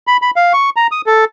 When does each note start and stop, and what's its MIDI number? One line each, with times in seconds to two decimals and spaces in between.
0.07 0.17 83
0.22 0.31 83
0.36 0.53 77
0.53 0.70 85
0.76 0.87 82
0.91 1.02 87
1.06 1.25 69